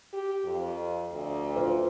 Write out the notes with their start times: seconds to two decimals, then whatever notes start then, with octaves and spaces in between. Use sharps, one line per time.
0.13 G4
0.45 F2
1.12 D2
1.56 F4 C5